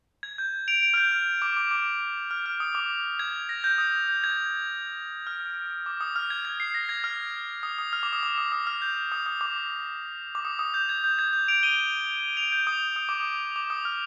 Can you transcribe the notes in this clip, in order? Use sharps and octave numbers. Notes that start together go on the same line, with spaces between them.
G#6
G6
D7 F7
D7 F7
F6
G6
F6
D6
D6
D6
F6
F6
D#6
D6
G#6
A#6
G6
D#6
G6
G#6
F6
D6
D#6
F6
G#6
G#6
C7
A#6
G#6
F6
D#6
D#6
F6
D6
D#6
D6
D#6
D#6
F6
G6
D#6
D#6
D6
D6
D#6
D#6
G6
G#6
G6
G#6
G6
D7 F7
D#7 G7
D7 F7
G6
D#6
D#6
D6
D#6
D6
D#6
F6